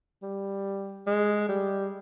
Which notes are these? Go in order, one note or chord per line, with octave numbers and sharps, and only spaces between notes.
G3
G#3
G3